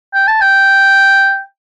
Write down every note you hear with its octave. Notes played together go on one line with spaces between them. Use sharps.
G5
A5
G5